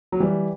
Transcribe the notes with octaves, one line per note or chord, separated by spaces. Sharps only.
F#3
E3 G3